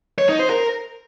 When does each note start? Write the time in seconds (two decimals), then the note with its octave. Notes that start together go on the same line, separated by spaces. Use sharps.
0.18 C#5
0.29 D#4
0.39 C5
0.50 A#4